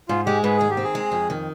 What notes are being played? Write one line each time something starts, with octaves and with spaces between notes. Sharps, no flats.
G#2 F4
G#3 G4
G#2 B4
D#3 G#4
G4
C4
G#4
G#3
F2
D#3